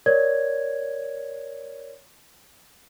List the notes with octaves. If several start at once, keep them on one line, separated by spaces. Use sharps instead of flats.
A#4 C#5 D5 G#6